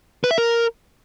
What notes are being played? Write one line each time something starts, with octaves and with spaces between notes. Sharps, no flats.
B4
E5
A#4